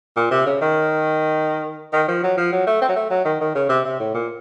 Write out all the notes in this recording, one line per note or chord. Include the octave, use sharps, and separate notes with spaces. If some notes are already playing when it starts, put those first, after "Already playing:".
A#2
C3
C#3
D#3
D#3
F3
F#3
F3
F#3
A3
C4
F#3
A3
F#3
D#3
D#3
C#3
C3
C3
A2
A#2